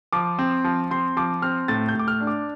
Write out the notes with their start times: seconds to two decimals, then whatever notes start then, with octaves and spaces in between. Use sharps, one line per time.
0.13 F3 D6
0.39 C4
0.64 F3
0.91 C4 C6
1.17 F3 D6
1.42 C4 F6
1.68 A2 A6
1.88 G6
1.95 A2 D6
2.08 F6
2.21 D4
2.27 D6